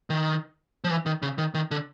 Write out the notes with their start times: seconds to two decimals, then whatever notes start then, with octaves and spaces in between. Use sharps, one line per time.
0.10 D#3
0.84 F3
0.90 E3
1.06 D#3
1.22 C#3
1.38 D#3
1.54 D#3
1.71 D3